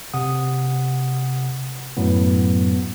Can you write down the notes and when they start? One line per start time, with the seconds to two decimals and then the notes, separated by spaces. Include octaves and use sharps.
0.14 C3 F#5 D#6
1.97 F#2 A2 F#3 B3